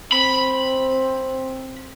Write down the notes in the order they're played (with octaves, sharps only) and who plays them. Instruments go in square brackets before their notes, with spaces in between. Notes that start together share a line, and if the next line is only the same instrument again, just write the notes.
[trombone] C4 [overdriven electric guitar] B5